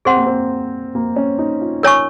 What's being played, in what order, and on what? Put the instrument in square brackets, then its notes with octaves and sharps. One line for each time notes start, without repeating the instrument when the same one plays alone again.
[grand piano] C4 [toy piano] G#4 C5 F#5 C6
[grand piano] A#3
C4
A#3
C#4
D#4
F4
[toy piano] A#4 C#5 G#5 C#6